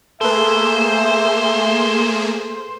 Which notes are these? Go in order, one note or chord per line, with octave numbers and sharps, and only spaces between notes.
A3 A#3 G#4 A4 B4 C5 E5